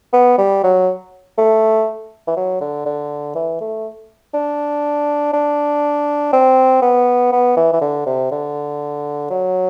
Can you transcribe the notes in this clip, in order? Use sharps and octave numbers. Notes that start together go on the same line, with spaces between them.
B3
G3
F#3
A3
E3
F#3
D3
D3
E3
A3
D4
D4
C4
B3
B3
E3
E3
D3
C3
D3
F#3